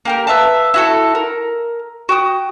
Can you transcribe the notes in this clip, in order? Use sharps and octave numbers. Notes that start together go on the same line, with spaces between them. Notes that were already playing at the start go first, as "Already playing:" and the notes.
A#3 G4 A#4
B4 E5 F5 A5
E4 F#4 A4
A#4
F#4 G5 D#6